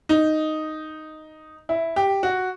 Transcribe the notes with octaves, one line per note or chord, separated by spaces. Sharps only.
D#4
E4
G4
F#4